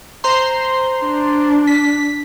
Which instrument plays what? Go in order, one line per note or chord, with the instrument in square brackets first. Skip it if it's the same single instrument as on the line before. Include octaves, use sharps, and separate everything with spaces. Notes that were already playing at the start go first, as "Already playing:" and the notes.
[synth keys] C5 A#5 C6
[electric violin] D4
[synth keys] B6